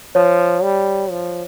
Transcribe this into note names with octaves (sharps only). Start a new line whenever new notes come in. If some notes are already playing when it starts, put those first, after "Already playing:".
F3 C#5
G3
F3